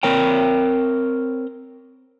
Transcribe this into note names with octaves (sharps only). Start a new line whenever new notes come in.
C4 A#4 C#5 G5